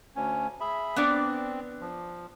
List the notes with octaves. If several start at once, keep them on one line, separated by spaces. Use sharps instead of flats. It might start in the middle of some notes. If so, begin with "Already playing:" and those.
D2 C#4
G#4 E5 B5
B3 C4 D4 D5
F3